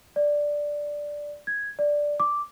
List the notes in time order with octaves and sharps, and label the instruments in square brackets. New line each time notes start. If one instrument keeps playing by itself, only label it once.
[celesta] D5
G#6
D5
D6